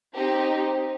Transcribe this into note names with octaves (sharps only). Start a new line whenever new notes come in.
C4 D#4 G4